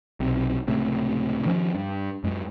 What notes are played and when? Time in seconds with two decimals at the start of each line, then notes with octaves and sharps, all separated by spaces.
0.20 B1 C3
0.68 C#2 A2 C3
1.45 D#3 F3 C4 C#4
1.75 G2
2.24 F#2 G#3